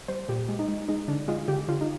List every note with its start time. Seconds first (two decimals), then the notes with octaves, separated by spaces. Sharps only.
0.08 G3 C5
0.29 A#2 G4
0.49 G#3
0.59 D#4
0.68 G#3
0.88 G#3 D#4
1.08 D3 D4
1.28 G#3 F4
1.48 D3 G4
1.68 D3 F4
1.81 D#4